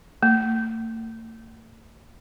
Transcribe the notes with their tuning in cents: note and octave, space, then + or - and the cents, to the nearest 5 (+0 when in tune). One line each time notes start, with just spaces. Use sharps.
A3 +45